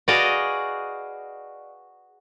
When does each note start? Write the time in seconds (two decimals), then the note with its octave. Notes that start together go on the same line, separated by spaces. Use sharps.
0.08 F#4 G#4 B4 D5 D#5 F5